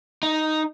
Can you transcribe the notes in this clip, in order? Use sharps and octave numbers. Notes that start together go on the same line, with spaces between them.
D#4